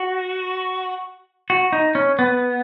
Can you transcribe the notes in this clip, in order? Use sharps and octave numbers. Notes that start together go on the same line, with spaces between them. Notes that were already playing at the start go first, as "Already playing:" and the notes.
Already playing: F#4
F#4
D#4
C#4
B3